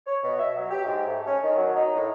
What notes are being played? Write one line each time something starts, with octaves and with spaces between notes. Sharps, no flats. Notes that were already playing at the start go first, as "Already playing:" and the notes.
C#5
B2
E5
F#3
G4
G#2
A3
C#4
D#3
F#3
D#4
A2